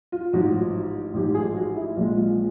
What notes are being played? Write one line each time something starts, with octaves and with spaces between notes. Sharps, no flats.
F4
A1 G#2 F3 F#4
A1 G#2 F3 G4
G#4
F#4
E4
A#1 A#2 F3 G#3 F4
F4